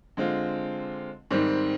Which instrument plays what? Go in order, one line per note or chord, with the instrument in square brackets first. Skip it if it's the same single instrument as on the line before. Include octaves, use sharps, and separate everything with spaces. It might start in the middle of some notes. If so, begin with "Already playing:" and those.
[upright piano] D3 G#3 C4 F4
G#2 D#3 G3 C4